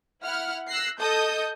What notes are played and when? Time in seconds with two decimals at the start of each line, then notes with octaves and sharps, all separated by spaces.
0.23 E4 F#5 F6
0.68 E6 F#6 A#6 C7
1.00 A4 D#5 A5 D#6 G6